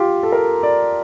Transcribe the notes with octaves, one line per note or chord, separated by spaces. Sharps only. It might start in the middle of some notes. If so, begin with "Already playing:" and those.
Already playing: F4 G4
A4
A#4
D5